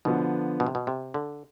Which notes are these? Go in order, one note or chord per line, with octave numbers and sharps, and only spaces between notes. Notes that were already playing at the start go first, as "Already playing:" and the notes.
B2 D3 F3 B3 D4
B2
C3
B2
C3
D3